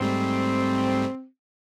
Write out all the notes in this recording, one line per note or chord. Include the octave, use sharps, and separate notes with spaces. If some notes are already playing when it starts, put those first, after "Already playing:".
G#2 G3 A3 C4